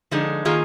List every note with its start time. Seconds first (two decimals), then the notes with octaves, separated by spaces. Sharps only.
0.11 D3 F3 G#3 D#4
0.45 D#3 A#3 F4 G#4